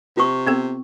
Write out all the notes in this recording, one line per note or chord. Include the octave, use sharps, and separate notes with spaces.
C3 F4 C#6
B3 C4 A4